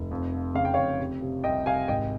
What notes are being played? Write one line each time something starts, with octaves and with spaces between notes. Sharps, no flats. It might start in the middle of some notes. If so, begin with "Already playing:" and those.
Already playing: F1
F2
F3
C#3 F5
G5
F2 C#5 F5
C3
C3
C2 D#5 G5
C3 F5 G#5
G#1 D#5 G5